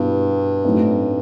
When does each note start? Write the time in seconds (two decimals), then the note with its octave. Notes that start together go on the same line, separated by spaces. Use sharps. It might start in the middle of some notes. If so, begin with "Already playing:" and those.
Already playing: G2 B2 G3 B3 E4
0.64 A2 F#3 A3 C4 D#4